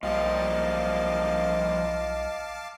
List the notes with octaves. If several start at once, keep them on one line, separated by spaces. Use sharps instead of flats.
B1 A#2 F3 G3 D#5 F5 A5 D6